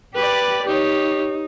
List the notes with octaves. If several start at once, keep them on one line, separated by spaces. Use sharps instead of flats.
G4 B4 D5
D#4 G4 C#5